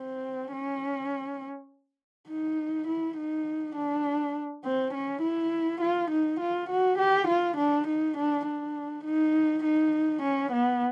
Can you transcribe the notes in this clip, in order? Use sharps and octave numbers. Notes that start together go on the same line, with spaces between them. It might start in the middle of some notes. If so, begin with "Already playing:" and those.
Already playing: C4
C#4
D#4
E4
D#4
D4
C4
C#4
E4
F4
D#4
F4
F#4
G4
F4
D4
D#4
D4
D4
D#4
D#4
C#4
B3